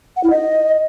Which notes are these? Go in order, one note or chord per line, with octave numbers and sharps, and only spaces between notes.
F#5
E4
D#5